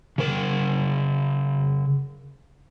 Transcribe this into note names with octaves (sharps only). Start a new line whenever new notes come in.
C#3 A#4